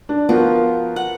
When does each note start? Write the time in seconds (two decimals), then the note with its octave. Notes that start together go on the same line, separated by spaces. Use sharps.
0.09 D4
0.29 F3 B3 F#4 A#4
0.96 F#5